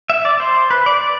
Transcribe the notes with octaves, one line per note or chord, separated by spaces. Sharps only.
E5
D5
C5
B4
D5
D5